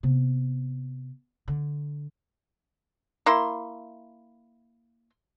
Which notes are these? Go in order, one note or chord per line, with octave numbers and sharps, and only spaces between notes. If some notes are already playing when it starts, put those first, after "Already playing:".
C3 B3
D3
A#3 E4 C6